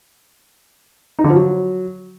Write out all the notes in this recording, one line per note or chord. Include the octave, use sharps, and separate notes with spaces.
D#4
D3
F3
F#3